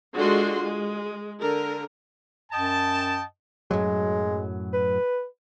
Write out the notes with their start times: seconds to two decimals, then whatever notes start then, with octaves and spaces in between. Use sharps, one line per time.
0.14 D3 G#3 F4 F#4 C6
0.62 G#3
1.38 D3 A#4
2.52 F#2 D#5 G5 A5
3.71 F#2 A2 F#3 G#3
4.73 B4